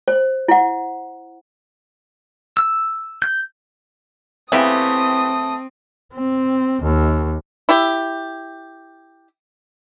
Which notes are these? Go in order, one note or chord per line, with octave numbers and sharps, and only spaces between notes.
C5
E4 F#5
E6
G6
C#3 E3 A3 B3 C4 E4 G4 D#6
C4
D#2
E4 G4